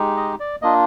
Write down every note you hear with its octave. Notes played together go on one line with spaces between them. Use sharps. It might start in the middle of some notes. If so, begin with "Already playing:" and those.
Already playing: G#3 D#4 G4
D#5
D5
A#3 D4 F4 D#5